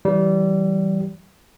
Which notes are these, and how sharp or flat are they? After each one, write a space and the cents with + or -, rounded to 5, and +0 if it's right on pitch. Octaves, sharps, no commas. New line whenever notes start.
E3 +0 G3 -25